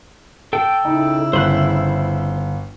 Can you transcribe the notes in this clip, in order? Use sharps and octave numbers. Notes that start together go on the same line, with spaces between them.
A4 G5
C#3 D#4 E4
G1 C5 B5 F#6